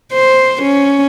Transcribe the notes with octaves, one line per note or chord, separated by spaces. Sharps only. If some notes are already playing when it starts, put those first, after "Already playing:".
C5
C#4